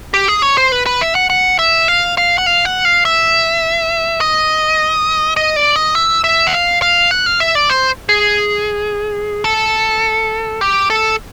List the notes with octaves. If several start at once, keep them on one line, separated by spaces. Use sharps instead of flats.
G4
G#4
C#5
C5
B4
B4
E5
F#5
F#5
E5
F5
F5
F#5
F5
F#5
F5
E5
D#5
D#5
D5
D#5
E5
E5
F#5
F5
F5
F#5
F5
E5
D5
C5
G#4
A4
G4
A4